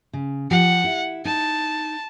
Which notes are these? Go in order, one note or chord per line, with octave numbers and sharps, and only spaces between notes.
C#3
F3 G4 F#5
E4
D#4 A5